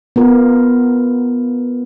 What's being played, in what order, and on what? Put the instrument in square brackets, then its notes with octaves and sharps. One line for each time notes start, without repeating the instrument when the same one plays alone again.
[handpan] B3 F4 A#4